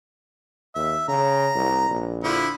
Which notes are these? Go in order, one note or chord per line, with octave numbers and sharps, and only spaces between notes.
D#2 E5
C#3 A#5
C2
A#1
D3 F3 E4